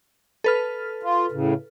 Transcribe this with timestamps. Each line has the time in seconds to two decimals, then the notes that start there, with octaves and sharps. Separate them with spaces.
0.44 A4 B4 F6
1.03 F4
1.32 A2 C#3